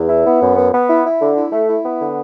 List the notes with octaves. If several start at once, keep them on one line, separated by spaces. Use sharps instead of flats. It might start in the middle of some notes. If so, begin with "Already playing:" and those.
Already playing: E2
E4
B3
F#2
B3
B3
E4
E4
D3
E4
A3
E4
B3
D3